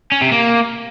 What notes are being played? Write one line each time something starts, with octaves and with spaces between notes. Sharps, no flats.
C#4
C3
A#3